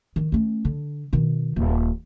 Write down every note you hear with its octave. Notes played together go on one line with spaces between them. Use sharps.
D#3
A3 C#4
D3
B2 D#3
D#1